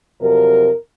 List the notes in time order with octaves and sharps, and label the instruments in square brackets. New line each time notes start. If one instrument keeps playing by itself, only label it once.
[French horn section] F2 C3 F#3 A#4